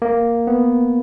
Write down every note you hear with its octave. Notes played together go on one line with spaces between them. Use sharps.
A#3
B3